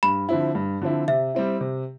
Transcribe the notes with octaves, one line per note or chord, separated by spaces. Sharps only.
G2 B5
D3 F3 C4 E4
G2
D3 F3 C4 E4
C3 E5
G3 C4 E4
C3